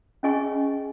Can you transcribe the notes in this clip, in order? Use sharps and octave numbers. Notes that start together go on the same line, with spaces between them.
C#4 G#4 D#5 G#5 C#6